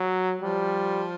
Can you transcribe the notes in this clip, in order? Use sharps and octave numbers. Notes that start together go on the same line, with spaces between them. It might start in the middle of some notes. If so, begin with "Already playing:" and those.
Already playing: F#3
F3 G3